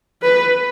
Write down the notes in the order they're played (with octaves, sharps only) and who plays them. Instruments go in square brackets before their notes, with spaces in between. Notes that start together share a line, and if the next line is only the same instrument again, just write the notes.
[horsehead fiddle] B4